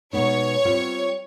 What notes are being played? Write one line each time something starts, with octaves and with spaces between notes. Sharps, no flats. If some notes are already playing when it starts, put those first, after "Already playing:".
B2 G#3 B3 D#4 C#5
G3 C4 F4